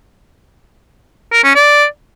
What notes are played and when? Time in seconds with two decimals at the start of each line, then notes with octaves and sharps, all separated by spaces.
1.33 A#4
1.44 C#4
1.55 D5